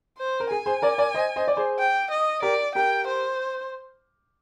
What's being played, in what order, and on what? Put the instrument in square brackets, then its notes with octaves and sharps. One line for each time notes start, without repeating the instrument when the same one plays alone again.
[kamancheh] C5
[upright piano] A#4
[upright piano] G#4 [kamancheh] G#5
[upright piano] G#4 C5
A#4 D5
A#4 D5
C5 D#5
C5 D#5
D5
G#4 C5
[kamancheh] G5
D#5
[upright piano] G4 A#4 [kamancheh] D5
[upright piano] G4 A#4 [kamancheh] G5
[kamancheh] C5